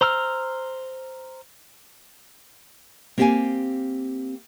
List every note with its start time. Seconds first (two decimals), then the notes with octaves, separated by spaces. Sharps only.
0.01 C5 A#5 E6 F6
3.18 A#3 C4 G4 E5 F5 G#5